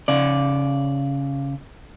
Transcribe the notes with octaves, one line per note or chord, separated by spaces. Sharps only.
C#3 D5